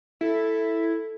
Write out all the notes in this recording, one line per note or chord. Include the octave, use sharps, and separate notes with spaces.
E4 A4